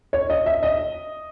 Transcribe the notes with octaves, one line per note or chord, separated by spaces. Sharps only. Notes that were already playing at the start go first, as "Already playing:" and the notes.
C#5
D#5
E5
D#5